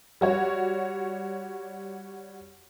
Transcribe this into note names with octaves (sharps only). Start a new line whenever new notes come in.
G3 F#4 C#5